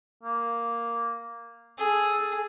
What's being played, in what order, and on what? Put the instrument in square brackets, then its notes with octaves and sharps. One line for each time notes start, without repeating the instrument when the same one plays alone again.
[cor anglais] A#3
[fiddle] G#4 [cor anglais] A4